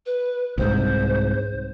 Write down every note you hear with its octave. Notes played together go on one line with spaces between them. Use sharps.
B4
C2 G#2 C5